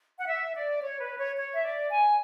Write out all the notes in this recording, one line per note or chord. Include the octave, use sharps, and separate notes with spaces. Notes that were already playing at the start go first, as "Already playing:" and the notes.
F#5
E5
D5
C#5
B4
C#5
C#5
E5
D5
G#5